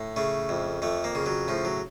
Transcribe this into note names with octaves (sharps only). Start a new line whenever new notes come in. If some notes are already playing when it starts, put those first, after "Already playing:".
Already playing: A2
C#3 A3
F2
F2 A3
A#3
C#3
F#3
A2 F3
F#3